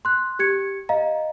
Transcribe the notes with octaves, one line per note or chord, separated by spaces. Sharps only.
C6 F#6
G4 G#6 C#7
D#5 F5 A#5